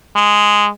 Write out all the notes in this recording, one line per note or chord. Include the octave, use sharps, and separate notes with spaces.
G#3